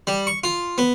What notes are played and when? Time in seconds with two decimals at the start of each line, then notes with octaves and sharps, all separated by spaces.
0.07 G3
0.27 C#6
0.44 F4
0.78 B3